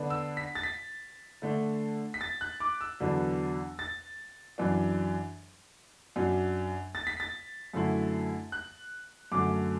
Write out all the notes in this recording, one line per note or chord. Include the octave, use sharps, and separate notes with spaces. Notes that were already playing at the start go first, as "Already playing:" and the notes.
Already playing: D3 B3 D4
E6
B6
A6
B6
D3 A3 D4
B6
A6
F#6
D6
E6
E2 D3 F#3 B3 D4
A6
F#2 E3 D4
F#2 F#3 D4
A6
B6
A6
F#2 D3 A3 E4
F#6
F#2 D3 A3 D6